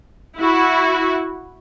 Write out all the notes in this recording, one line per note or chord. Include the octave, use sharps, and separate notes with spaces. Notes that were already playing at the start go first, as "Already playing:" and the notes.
E4 F#4